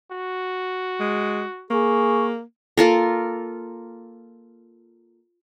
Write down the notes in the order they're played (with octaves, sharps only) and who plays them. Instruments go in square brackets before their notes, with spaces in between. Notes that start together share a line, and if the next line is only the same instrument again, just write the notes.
[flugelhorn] F#4
[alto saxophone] G#3
[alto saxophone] A#3 [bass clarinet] G#4 [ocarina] C#6
[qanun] A#3 F4 A4 A#4